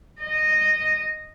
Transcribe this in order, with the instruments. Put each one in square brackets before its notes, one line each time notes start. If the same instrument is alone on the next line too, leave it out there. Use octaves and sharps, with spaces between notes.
[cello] D#5